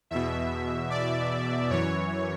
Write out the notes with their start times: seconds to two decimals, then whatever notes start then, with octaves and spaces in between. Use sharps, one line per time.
0.11 E2 B2 E5
0.90 D5
1.70 F#2 E3 C#5